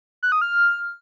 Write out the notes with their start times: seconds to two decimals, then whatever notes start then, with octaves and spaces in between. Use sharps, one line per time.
0.23 F#6
0.32 D#6
0.41 F6